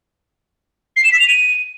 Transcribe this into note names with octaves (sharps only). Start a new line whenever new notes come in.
C7
E7
B6
F7
D#7